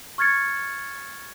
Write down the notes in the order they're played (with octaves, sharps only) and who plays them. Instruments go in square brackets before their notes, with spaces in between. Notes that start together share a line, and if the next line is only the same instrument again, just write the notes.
[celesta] C#6 F6 G#6 A6 C#7